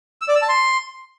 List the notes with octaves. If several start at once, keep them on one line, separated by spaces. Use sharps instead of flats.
E6
D5
E6
A5
C6